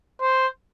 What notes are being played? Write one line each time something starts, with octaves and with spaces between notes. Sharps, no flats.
C5